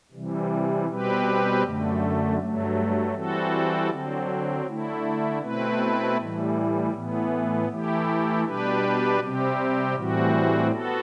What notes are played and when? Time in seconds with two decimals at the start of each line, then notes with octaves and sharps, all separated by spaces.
0.12 C3 E3 G3
0.88 B2 G3 C4 G4 B4
1.63 F#2 D3 A3
2.39 G2 F#3 A3
3.14 E3 G3 C4 F#4 A4
3.90 D3 F#3 C4
4.66 D3 A3 E4
5.42 B2 A3 C4 E4 B4
6.17 A2 E3 G3
6.93 A2 E3 B3
7.69 E3 A3 E4 G4
8.44 B2 G3 D4 G4 B4
9.20 C3 G3 C4 G4
9.95 A2 E3 G3 C4 F#4
10.71 B3 F#4 A4